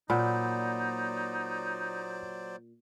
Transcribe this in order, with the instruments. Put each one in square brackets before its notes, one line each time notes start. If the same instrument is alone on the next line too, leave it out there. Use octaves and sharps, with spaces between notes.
[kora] A#2 [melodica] F#3 C5 D5 [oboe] D#4 [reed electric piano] F#5 B5